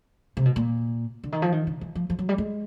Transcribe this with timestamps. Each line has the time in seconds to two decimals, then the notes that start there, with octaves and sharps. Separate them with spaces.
0.37 C3
0.45 B2
0.56 A#2
1.24 D3
1.32 D#3
1.42 F3
1.52 D#3
1.67 D3
1.81 E3
1.95 F3
2.10 F3
2.19 F#3
2.29 G3
2.38 G#3